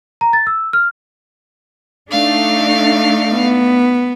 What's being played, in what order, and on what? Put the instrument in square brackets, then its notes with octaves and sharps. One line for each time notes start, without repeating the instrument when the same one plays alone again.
[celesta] A#5
A6
E6
F6
[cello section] A3 D4 D#4 [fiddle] F5
[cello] B3